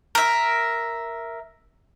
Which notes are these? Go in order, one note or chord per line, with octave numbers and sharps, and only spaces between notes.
A#4 E5